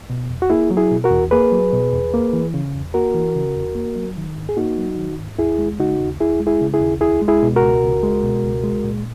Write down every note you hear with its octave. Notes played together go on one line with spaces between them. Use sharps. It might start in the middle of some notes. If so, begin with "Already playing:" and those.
B2
E2
F#4
A#3 E4 G#4
F#3
E4 G#4
B2
F#4 A#4
E2
A#3 G#4 B4
F#3
B2
E2
A#3
E3
C#3
E2
A#3 F#4 A#4
E3
C#3
E2
A#3
F#3
D#3
G#2
G#4
A#3 D#4 F#4
F#3
D#3
G#2
D#2 E4 G#4
G#3
C#3 D#4 F#4
D#2
D#2 E4 G#4
G#3
E4 G#4
C#3
E4 G#4
D#2
C#2 E4 G#4
G#3
E4 G#4
B2
F#4 A#4
C#2
C#2
G#3
B2
C#2
G#3
A#2